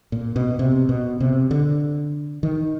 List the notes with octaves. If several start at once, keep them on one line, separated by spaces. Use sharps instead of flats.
A#2
B2
C3
B2
C3
D3
D#3